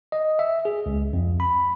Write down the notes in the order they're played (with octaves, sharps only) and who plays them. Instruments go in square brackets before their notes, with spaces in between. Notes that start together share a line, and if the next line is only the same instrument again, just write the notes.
[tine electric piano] D#5
E5
G#4
C#2
F2
B5